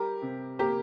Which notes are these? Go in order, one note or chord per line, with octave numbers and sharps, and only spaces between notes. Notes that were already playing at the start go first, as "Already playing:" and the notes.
Already playing: G3 G4 A#4
C3
A#3 G4 A#4